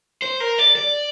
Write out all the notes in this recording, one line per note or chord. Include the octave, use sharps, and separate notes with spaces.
C5
A#4
D5
D5